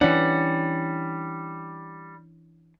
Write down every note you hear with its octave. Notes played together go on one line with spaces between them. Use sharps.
E3 G3 C#4 D4 F#5